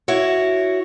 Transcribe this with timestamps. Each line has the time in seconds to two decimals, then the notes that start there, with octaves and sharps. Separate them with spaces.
0.08 E4 F#4 C#5